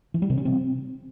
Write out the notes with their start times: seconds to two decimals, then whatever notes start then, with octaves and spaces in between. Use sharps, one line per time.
0.14 E3
0.22 G3
0.30 C3
0.37 C#4
0.45 C4